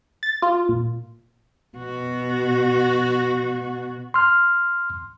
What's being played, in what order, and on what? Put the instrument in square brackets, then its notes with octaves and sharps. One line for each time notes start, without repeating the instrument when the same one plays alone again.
[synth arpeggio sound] A6
F4
A#2
[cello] B2 F#4
[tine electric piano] C6 F6